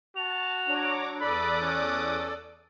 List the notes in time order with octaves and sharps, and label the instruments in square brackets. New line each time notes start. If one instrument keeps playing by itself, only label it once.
[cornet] F#4 [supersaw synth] A5 [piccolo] F7
[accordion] F#3 D4 [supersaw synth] C#5 A#5 D6
[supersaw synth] E2 D6 D#6 [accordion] A4 D5 [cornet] B5 [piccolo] F#6
[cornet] C#4